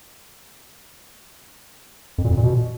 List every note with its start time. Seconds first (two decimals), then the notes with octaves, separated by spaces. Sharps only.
2.18 F2
2.24 A#2
2.31 F2
2.37 A#2
2.43 B2